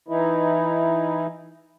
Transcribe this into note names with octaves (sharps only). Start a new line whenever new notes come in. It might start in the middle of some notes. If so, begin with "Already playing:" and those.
E3 D#4 E4